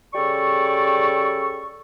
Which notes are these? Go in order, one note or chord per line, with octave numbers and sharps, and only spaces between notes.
C#3 G3 A4 D5 C#6